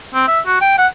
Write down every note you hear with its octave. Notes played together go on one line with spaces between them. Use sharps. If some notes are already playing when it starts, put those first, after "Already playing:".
C4
E5
F#4
G5
F#5